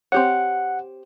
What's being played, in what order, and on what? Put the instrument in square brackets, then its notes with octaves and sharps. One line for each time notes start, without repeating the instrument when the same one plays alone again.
[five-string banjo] C4 G4 C#5 [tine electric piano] F#5